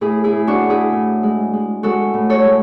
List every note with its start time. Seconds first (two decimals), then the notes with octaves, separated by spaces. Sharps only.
0.01 A2 E4 G#4
0.24 E4 G#4
0.32 A2
0.47 D4 F#4
0.63 A2
0.70 E4 G#4
0.92 A2
1.23 G#3
1.53 G#3
1.83 G#3 F#4 A4
2.14 A2
2.30 A4 C#5
2.45 G#3